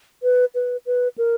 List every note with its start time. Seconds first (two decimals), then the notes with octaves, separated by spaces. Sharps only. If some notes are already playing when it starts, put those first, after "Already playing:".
0.23 B4
0.55 B4
0.86 B4
1.18 A#4